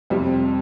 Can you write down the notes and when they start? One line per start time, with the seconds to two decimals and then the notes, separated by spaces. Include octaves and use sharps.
0.10 F2 C3 G3